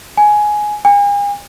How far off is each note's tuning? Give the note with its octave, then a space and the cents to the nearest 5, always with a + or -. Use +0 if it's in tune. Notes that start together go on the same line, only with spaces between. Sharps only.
G#5 +10
G#5 -40